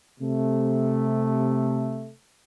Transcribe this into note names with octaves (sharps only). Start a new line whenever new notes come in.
C3 A3